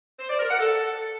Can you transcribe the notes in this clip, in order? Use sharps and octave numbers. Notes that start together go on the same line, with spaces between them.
C5
D5
A#4
F#5
A4